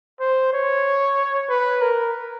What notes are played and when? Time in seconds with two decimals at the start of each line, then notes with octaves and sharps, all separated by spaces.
0.20 C5
0.53 C#5
1.49 B4
1.82 A#4